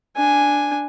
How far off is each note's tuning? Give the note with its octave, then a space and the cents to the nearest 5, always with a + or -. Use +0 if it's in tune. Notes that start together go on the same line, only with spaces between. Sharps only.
D4 +0 G#5 +0